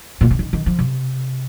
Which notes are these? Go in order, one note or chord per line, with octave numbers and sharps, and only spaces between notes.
A#2
C3
D#3
D#3
F3
C3